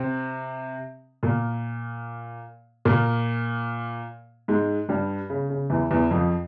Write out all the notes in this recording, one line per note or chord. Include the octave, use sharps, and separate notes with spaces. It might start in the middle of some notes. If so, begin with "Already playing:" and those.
Already playing: C3 C4
A#2 A#3
A#2 A#3
G#2 G#3
G2 G3
C#3
C#3
E2 E3
E2 E3
F2 F3